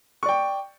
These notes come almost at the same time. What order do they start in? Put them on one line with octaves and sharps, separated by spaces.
C#6 D5 G5